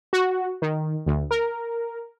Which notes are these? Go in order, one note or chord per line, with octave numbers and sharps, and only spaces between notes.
F#4
D#3
D2
A#4